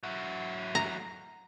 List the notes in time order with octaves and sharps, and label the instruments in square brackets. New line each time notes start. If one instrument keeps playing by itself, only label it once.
[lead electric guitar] F#3 E4
[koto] A#5